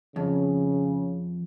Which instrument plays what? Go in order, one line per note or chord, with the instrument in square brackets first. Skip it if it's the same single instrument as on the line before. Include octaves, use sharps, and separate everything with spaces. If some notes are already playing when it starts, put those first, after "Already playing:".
[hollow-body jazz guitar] F2 [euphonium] C#3